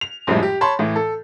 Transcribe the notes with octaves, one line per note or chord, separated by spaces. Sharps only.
F7
A#1 F#2 A2 F3 G3 G#3
G4
C#5 A5 B5 C6
A2 E3
A4